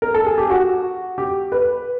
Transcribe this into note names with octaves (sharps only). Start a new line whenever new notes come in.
A#4
A4
G#4
G4
F#4
G4
B4